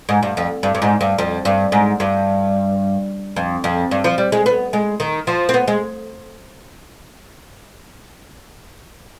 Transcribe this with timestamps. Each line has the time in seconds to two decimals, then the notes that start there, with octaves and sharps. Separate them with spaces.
0.09 G#2
0.23 G2
0.37 F2
0.63 G2
0.75 G2
0.82 G#2
1.01 G2
1.18 F2
1.45 G2
1.72 G#2
2.00 G2
3.36 F2
3.64 F2
3.91 G2
4.04 F3
4.18 G3
4.32 G#3
4.46 B3
4.73 G#3
5.00 D#3
5.27 F3
5.49 C4
5.54 B3
5.68 G#3